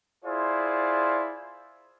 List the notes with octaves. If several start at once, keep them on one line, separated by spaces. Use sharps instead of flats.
E4 F4 G#4 C5 D5